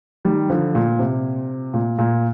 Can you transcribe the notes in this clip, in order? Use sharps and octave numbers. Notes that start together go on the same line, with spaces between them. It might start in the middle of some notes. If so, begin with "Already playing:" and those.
D#3 G3
D3 F3
A#2
C3
A#2
A#2